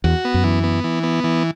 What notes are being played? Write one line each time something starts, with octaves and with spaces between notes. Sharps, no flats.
E2 F#4
B3
F#2
E3
B3
E3
B3
E3